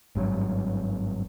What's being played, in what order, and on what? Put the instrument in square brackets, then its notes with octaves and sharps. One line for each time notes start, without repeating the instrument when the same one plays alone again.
[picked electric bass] G#1 G2 C#3 F#3